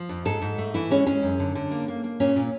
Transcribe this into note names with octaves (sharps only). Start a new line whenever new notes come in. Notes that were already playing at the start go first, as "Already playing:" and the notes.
Already playing: F3
F2
G#2 A4
G#2
A3
E3 E4
G#3 C#4
G#3 C#4
F#2
D3
D3
A#3
A#3
A#3
A#2 C#4
A#2